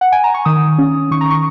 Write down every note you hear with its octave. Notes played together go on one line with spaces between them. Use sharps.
F#5
G#5
A#5
C#6
D#3 D#6
C#4
D#3 C#6
A#5
C#6